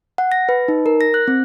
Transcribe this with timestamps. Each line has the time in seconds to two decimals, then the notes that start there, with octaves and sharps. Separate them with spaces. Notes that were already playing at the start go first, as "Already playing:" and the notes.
0.18 F#5
0.32 A#6
0.49 B4
0.68 D#4
0.86 A#4
1.01 A#6
1.14 F#6
1.28 C4